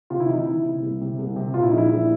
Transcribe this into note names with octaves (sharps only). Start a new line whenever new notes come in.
C3 F4
E4
E3 D#4
E4
E3
C3
C2
C3
C2
C3
A#2 F4
E4
D#4
A#1 E4
A#1